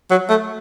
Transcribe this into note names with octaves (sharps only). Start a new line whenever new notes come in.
F#3
A3